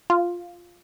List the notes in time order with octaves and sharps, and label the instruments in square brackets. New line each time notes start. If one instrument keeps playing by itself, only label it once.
[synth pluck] F4